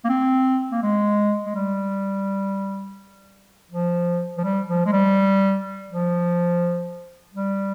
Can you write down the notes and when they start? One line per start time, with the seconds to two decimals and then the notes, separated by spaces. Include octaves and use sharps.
0.05 A#3
0.09 C4
0.72 A#3
0.83 G#3
1.46 G#3
1.55 G3
3.72 F3
4.38 F3
4.44 G3
4.69 F3
4.86 G#3
4.92 G3
5.90 F3
7.34 G3